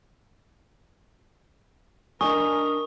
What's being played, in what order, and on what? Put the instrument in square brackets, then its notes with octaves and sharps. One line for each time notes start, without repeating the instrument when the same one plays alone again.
[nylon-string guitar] D4 D#5 G#5 [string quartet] A#4 [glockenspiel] C#6 [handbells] D#6